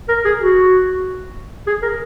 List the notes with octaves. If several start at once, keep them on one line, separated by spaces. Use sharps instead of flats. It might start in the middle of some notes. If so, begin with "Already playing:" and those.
A#4
G#4
F#4
G#4
A#4